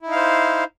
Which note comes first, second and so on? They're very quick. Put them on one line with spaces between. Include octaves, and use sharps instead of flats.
E4 D#4 F5 C5